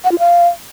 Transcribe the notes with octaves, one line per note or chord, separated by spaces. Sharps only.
F#5
F4
F5